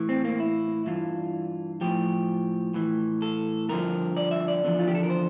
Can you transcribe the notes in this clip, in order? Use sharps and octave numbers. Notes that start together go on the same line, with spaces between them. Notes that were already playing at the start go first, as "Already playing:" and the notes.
Already playing: A2 E3
C4
A#3
E4
G2 E3 F4
A2 F3 G4
A2 E3
A4
G2 D3 F3 A#4
D5
E5
D5
E2 D3 F3
F4
G4
A4
A#4
C5